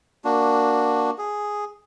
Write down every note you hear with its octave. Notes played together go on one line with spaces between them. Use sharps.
A#3 D4 F#4
G#4